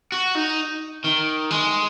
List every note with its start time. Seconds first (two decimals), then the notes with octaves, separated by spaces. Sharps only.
0.12 F#4
0.35 D#4
1.04 D#3
1.51 G#3